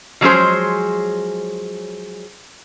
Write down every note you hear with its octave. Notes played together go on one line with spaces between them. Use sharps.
F3 F#3 G#3 C#4 G#4 C5